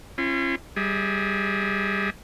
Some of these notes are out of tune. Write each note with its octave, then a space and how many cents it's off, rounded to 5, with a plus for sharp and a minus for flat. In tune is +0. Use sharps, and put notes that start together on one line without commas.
C#4 -35 F4 -45
G3 +5 G#4 +0 E5 -40